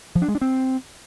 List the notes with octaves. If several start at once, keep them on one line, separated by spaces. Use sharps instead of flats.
F3
D4
G#3
D4
C4